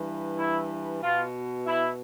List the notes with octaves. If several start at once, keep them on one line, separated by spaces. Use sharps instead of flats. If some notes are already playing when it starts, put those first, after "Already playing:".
Already playing: G2 E3
E4
B2 F4
E4